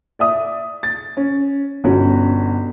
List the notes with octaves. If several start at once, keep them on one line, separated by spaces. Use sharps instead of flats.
D5 E5 D#6
A6
C#4
G1 B2 C#4 F#4